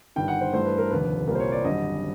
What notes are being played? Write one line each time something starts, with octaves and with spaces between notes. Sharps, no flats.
G1 G2 D#3 G5
F#5
C5
G2 E3 A3 C5
B4
A#4
F1 D#2 D3 B4
C2 A#2 G3 A#3 A#4
C5
C#5
D5
G#1 F#2 D3 G3 D#5